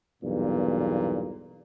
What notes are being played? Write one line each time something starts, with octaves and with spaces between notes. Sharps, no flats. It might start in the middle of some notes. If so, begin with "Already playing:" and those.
B1 E2 G2 A#2